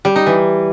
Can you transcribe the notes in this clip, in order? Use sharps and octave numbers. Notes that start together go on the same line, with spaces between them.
G3
D#4
E3